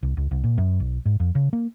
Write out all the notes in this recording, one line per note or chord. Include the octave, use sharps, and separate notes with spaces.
C2
C#2
C2
A#2
F#2
B1
G#2
F2
C#3
A#3